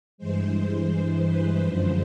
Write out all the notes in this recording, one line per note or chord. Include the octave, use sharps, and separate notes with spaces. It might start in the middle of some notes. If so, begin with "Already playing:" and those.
G2 E3 G#3 C5
C5
B4
F#2 D3 F3 G#3 C5